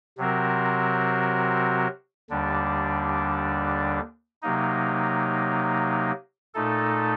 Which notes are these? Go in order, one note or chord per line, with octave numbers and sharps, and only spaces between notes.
C3 F#3 C4 F#4 A#4
D#2 D3 G3 D4
C3 F#3 A#3 D#4
A#2 A3 D#4 A4